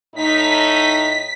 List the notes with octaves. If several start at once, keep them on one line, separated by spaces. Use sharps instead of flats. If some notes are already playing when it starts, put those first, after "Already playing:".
A2 D#4 B6